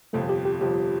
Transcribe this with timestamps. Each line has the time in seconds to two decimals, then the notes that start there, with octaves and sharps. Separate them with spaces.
0.13 G1 F2 C3 F3 A3 A4
0.29 G4
0.45 G4
0.61 G1 F2 C3 F3 G4